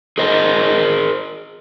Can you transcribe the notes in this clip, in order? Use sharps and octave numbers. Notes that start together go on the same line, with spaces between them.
G#4 A#4 C5 D#5